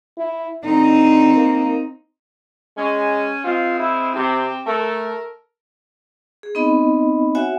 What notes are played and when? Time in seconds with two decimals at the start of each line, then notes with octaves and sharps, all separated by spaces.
0.18 E4
0.65 D3 C4 D#4
1.36 A#3
2.77 G#3 C#4
3.44 G#3 C4 F4
3.80 E4
4.16 C3 C4 G4
4.67 A3 A4 A#4
6.43 G#4
6.55 B3 C4 D#4 D#5 B5
7.35 F#4 C#5 E5 F#5 G#5